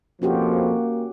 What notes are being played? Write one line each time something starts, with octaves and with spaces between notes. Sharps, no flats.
F2 B2 F3 A#3 C#4 F#4 G4